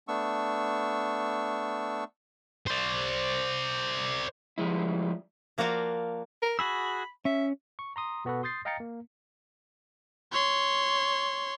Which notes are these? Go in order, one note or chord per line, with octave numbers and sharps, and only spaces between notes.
A3 B3 D4 C#6 E6
C5 D5
F3 G3 G#3 E4
F3 A#3 F#4 A#4 D5 F5
A#4
F#4 G#4 B5 E6
C#4 E5
C#6
A#5 C6 D#6
B2 B3 F#4 A4 B4
C6 D#6 G6 A6 C7
D#5 F5 G5 A#5 A6 C#7
A#3
C#5 C6